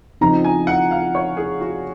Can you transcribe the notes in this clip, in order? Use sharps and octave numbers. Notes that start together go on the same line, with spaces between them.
C#3 F3 C4 D#4 A#5
G#5
F#5
F5
C#5
G#4
F#4